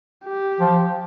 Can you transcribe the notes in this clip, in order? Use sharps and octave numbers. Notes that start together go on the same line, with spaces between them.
G4
F3